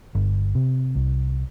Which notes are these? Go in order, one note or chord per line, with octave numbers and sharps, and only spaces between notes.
G1
C3
C2